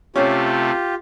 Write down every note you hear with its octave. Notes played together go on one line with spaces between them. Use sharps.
C3 A3 C#4 F4 G4